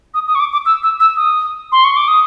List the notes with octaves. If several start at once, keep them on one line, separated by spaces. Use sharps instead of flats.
D#6
D#6
C#6
D6
D6
E6
E6
E6
D#6
C6
C#6
D6
D#6